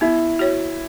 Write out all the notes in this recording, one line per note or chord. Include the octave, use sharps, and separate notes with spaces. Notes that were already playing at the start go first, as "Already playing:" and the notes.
B3 E4
F#4 C#5